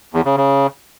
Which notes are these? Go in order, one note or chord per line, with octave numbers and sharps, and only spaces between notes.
E2
C#3
C#3